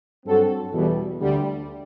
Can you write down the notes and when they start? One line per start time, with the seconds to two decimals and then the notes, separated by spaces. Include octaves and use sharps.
0.24 G2 F#3 C4 F#4 A4
0.72 E2 B2 G3
1.19 D2 D3 G3